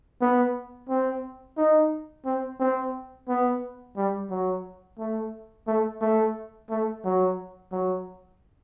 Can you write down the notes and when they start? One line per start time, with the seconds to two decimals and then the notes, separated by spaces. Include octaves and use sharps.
0.21 B3
0.89 C4
1.57 D#4
2.26 C4
2.60 C4
3.29 B3
3.97 G3
4.30 F#3
4.99 A3
5.67 A3
6.01 A3
6.70 A3
7.05 F#3
7.72 F#3